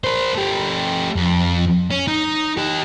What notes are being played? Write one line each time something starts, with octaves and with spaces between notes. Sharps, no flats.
A#4 C5
A3 G4
F2
C#4
D#4
G4 D#5